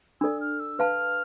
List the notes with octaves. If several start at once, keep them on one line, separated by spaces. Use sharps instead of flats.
D4 A4 D5 E6
F6
E6
B4 F5 A5 F6